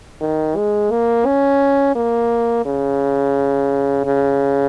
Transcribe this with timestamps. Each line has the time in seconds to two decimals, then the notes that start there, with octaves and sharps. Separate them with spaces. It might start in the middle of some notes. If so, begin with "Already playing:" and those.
0.21 D#3
0.56 G#3
0.91 A#3
1.26 C#4
1.96 A#3
2.66 C#3
4.05 C#3